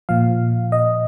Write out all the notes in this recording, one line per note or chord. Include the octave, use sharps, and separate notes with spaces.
A#2 F3 F5
D#5